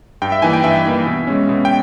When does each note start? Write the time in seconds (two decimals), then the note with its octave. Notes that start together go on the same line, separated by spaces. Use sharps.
0.22 G2 G5
0.32 E5
0.42 E3 A#3 D#4 G#5
0.53 G5
0.64 G2 E5
0.85 E3 A#3 D#4
1.07 B2
1.27 G#3 C#4
1.49 B2
1.65 G5